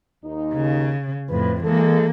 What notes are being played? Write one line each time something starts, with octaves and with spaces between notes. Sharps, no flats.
D#2 D#4
C#3
F2 A2 B4
E3 G#3 A#3 A4